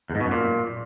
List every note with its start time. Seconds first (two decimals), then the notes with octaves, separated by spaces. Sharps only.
0.10 E2
0.15 G#2
0.20 B2
0.26 F#2
0.31 A#2